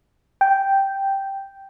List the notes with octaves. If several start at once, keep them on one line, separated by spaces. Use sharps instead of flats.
G5